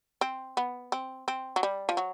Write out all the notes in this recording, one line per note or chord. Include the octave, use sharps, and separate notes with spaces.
C4
B3
C4
C4
F#3
G3
F3
F#3